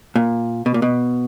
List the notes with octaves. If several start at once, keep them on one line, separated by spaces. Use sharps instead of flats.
A#2
B2
A#2
B2